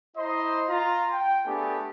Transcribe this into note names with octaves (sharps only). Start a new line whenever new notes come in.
E4 C5 D#5 A#5 C6
F4 A#5
G5
A3 B3 D4 G4 G#4 G#5